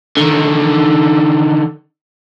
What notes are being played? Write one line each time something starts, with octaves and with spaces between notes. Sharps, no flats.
D3 D#3